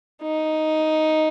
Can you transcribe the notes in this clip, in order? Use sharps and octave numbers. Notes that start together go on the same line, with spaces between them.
D#4